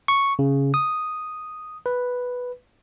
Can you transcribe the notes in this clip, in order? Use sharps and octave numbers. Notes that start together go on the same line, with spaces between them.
C#6
C#3
D#6
B4